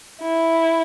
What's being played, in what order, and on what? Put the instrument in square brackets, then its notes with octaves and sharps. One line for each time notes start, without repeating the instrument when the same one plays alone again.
[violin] E4